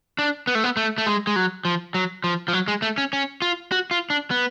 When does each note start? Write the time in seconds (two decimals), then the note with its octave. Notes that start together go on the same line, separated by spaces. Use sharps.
0.19 D4
0.47 B3
0.55 A3
0.64 B3
0.77 A3
0.98 A3
1.06 G#3
1.27 G#3
1.36 F#3
1.65 F3
1.94 F#3
2.24 F3
2.48 F3
2.53 F#3
2.68 G#3
2.82 A3
2.98 C#4
3.13 C#4
3.42 F4
3.72 F#4
3.91 F4
4.10 D4
4.31 B3